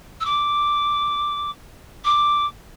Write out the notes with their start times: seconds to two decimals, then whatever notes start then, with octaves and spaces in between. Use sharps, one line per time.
0.20 E6
0.25 D6
2.05 D6